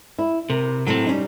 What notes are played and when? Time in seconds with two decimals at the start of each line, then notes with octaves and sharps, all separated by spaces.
0.19 E4
0.50 C3 A#4
0.87 A2 F#3 C4
1.06 G3 C#4 D#4